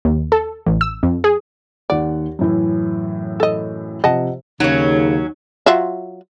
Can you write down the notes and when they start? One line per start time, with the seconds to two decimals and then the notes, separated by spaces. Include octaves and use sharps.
0.05 D#2
0.32 A4
0.66 A1
0.81 E6
1.03 F2
1.24 G#4
1.90 D#2 D5 F#5
2.39 F#2 A2 E3
3.40 A4 D#5
4.04 C3 F3 D#5 F#5 A5
4.60 D#2 C#3 F#3 C#4 D#4
5.66 F#3 F4 E5